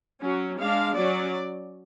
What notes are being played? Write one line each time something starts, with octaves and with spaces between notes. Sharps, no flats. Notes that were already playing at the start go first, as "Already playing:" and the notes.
F#3 C#4
G#3 D4 F5
F#3 C#4 D5